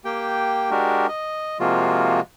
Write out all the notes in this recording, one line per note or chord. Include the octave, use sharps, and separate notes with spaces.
A#3 G4 G5
G#3 D4 F#4 G4 A#4
D#5
C3 F3 G#3 A#3 F4 F#4